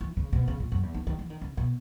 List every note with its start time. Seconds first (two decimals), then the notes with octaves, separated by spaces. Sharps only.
0.01 E3
0.17 C#3
0.33 B2
0.48 C#3
0.60 A#2
0.72 F#2
0.83 E2
0.94 D#3
1.07 D#3
1.19 E3
1.30 D#3
1.41 C#3
1.57 B2